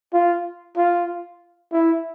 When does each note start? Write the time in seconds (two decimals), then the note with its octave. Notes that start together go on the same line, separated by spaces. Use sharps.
0.13 F4
0.77 F4
1.72 E4